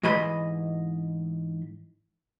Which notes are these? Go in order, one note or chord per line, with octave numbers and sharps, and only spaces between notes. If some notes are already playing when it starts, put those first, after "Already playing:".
G#2 E3 D#5 B5 C6